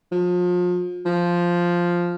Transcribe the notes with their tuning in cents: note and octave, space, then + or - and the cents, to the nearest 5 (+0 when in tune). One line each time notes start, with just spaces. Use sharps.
F3 +35
F3 +0